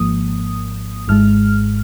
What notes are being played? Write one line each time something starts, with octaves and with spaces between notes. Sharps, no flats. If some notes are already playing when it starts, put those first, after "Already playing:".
Already playing: G#1 G#2 F3 A#3 D#6
G#1 G#2 G#3 F6